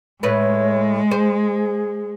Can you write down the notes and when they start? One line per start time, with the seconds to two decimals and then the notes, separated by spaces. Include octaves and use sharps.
0.23 A2 G#3 B4 C#5
1.11 G#4 C5